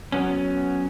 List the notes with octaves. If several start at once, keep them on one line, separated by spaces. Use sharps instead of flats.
F#3 B3 C#4